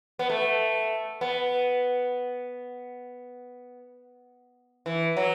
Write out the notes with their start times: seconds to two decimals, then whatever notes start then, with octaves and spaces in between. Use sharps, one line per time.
0.19 B3
0.30 A3
1.21 B3
4.86 E3
5.17 F#3